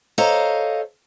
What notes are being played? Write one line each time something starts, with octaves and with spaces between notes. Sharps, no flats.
A4 C5 C#5 D#5 F5 A#5